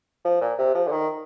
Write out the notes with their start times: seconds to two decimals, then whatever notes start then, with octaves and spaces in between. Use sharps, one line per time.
0.25 F3
0.41 A#2
0.58 C3
0.75 F3
0.87 D3
0.92 D#3